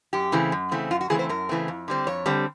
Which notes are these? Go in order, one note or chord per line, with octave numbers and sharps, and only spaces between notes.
F#2 G4
C#3 E3 A3 C4
F#2
C#3 E3 A3 C4
F#2 F4
F#4
C#3 E3 A3 C4 G#4
C5
F#2 A#4
C#3 E3 A3 C4
F2
D3 G3 C4
F2 C#5
D3 G3 C4